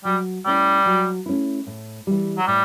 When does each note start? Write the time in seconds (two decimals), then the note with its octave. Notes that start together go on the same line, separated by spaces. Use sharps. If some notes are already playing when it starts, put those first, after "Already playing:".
0.05 F#3 G3
0.46 G3 A3 C#4 E4
0.86 F#3
1.26 A3 C#4 E4
1.67 A2
2.07 E3 G3
2.38 F#3
2.47 A2 G3